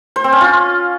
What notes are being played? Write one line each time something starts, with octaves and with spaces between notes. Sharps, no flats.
C5
C4
C#4
F4